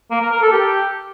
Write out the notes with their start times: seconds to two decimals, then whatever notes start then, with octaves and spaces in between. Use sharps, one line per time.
0.11 A#3
0.21 A#4
0.31 A#4
0.42 A4
0.52 G4